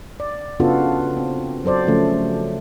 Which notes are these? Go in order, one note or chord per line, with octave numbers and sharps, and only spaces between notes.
D5
C#3 B3 D4 F4 F#4 A4
C4
F#3 A4 C5 D5
C#3 F3 A3 C#4